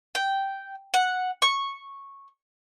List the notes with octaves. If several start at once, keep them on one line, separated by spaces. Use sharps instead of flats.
G5
F#5
C#6